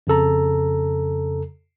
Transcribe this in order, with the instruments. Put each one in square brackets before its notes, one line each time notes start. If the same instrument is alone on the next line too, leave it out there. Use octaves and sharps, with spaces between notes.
[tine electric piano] F2 C#3 A4 A#5